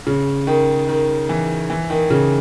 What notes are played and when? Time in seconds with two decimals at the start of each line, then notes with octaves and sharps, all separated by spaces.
0.07 C#3
0.47 D#3
0.89 D#3
1.29 E3
1.70 E3
1.90 D#3
2.10 C#3